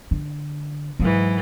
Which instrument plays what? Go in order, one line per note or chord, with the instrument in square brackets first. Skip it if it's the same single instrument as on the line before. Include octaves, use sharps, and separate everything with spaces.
[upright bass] D3
[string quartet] G#2 E3 [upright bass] F#3